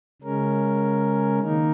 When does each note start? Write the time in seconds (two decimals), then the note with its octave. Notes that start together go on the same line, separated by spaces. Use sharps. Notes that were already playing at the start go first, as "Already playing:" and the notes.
0.22 C#3 G#3 C#4 A#4
1.40 D#3 A#3 D#4 A#4